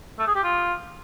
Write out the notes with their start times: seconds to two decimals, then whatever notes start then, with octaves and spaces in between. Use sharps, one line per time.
0.19 A3
0.27 G#4
0.35 G4
0.43 F4